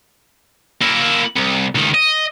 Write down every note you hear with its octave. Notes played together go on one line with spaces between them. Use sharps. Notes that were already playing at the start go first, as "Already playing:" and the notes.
A#3 E4
C2
C#2 D#3
D#5